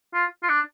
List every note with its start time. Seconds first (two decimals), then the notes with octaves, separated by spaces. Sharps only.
0.14 F4
0.43 F4
0.49 D4